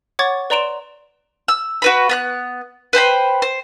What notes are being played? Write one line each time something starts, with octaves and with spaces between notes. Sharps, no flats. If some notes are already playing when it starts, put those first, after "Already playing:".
C#5 F#5 C#6 D6 G#6 A6
B4 D5 A#5 C6 D7 E7
E6
F#4 B4 B5
B3 B5 F#6
B4 C5 G5 B5
C5